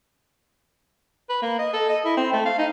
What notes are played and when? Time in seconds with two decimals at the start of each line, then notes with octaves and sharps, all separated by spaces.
1.29 B4
1.42 A#3
1.59 D#5
1.73 A4
1.89 D#5
2.05 E4
2.17 C4
2.33 A3
2.46 F5
2.58 D#4